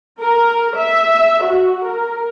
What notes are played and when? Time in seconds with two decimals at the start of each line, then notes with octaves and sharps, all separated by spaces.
0.22 A#4
0.77 E5
1.45 F#4
1.87 A#4